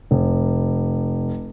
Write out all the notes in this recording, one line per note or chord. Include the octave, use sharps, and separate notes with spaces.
F1